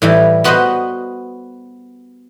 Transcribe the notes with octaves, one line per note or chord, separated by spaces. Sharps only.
A2 E3 G3
B3 F#4 B4 C5 D#5